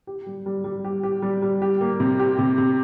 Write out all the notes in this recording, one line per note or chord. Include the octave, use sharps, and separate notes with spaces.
G4
G3
G3
G3
G4
G4
G3
G3
G4
A#3
C3
G4
C3
C3